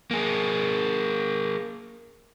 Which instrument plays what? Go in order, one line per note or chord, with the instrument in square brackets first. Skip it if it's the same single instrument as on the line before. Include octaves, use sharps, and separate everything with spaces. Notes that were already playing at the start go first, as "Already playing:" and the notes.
[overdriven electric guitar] A#3 G#4